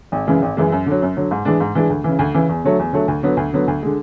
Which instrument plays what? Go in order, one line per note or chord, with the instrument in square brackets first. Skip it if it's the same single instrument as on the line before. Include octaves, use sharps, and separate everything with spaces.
[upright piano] G#1
F#2 C#3 E3 G#3
G#1
F#2 C#3 E3 G#3
F#2
D3 F#3
F#2
D3 F#3
G#2
E3 G#3 D4
G#2
E3 G#3 D4
D2
C#3 E3
D2
C#3 E3
E2
D3 F#3 A3
E2
D3 F#3 A3
D2
D3 F#3 B3
D2
D3 F#3 B3
D2
D3 G#3